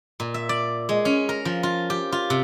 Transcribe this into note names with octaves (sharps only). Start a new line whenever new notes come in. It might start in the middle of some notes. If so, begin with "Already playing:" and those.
A#2
E5
D5
G#3
C#4
A#4
F3
F4
G4
F4
C3